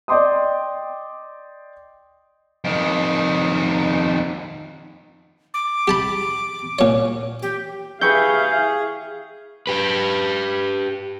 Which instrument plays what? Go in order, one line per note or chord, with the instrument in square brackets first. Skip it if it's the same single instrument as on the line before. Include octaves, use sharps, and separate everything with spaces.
[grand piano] D5 D#5 G5 C6 D6 D#6
[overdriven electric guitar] F2 D#3
[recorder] D6
[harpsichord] G4 A5 B5
A#2 C#5
[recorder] G4
[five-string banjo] E4 G4 B4 [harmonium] G#4 [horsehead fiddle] E5 F5 [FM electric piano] C#6 G6
[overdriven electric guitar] G4 B4